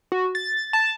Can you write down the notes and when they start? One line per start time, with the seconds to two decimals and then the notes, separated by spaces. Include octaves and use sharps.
0.12 F#4
0.35 A6
0.73 A5